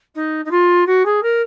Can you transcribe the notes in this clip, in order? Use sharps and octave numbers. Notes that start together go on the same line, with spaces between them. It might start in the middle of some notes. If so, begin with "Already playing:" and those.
D#4
D#4
F4
F#4
G#4
A#4